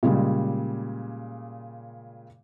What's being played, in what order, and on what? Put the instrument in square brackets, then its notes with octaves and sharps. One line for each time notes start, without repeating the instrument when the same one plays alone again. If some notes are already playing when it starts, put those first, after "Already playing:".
[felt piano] A#2 C#3 G3 G#3